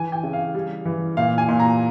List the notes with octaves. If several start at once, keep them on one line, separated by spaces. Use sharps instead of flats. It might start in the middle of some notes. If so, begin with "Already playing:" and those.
Already playing: E3 G#5
G5
C#3
F5
G3
E3
A#2 F5
G#5
A#2
A#5